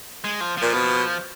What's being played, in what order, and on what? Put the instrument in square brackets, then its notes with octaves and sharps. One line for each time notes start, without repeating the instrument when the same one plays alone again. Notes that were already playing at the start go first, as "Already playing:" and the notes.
[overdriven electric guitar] G#3
F3
[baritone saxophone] A#2 [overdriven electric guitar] F3
[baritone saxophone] B2